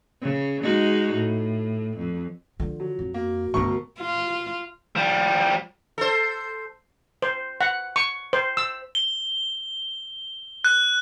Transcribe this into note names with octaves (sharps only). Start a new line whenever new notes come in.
C#3
G#3 D#4 F#4
A2
F2
D3 F3 F4
F#3
F2
A#3 F#4
D2 G2 B3 A#4 C#6
F4
F3 G3
A4 C5
C5
F#5
C#6
C5
E6
G7
F#6